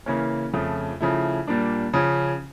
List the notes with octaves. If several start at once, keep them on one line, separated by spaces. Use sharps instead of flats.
C#3 E3 A#3 C#4
F2 C#3 F3 A3
C#3 F3 A3 E4
A#2 G3 A#3 D4
C#3 F3 C#4